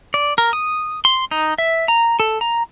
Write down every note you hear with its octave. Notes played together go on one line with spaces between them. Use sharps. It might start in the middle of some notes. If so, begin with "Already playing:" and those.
D5
A#4
D#6
C6
D#4
E5
A#5
A4
A#5